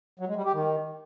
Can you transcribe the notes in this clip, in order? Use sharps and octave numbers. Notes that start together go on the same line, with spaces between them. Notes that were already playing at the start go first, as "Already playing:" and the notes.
F#3
G#3
G3
G4
D#3